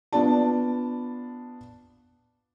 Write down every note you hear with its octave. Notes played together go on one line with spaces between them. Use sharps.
B3 D4 F4 D5 A5